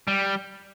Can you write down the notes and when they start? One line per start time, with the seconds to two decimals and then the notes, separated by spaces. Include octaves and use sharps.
0.08 G3